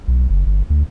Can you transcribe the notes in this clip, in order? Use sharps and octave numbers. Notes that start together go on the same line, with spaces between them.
B1
F#1
G1
D2